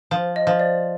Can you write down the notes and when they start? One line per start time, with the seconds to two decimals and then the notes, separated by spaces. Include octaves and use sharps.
0.11 F3 C5
0.36 D#5
0.47 F3
0.59 D5